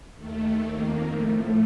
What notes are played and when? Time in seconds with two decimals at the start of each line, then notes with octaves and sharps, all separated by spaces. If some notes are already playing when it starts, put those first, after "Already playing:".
0.17 D#2 D#3 A3
0.62 F2 D#3 A#3
1.07 A2 F3 A3